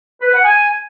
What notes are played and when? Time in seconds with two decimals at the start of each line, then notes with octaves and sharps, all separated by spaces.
0.22 B4
0.33 F#5
0.44 G#5